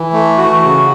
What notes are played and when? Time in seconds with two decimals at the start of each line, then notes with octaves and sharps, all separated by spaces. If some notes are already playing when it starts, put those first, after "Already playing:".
Already playing: E3
0.13 A3
0.38 F#4
0.63 C#3